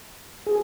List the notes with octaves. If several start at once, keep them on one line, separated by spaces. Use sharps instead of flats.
G#4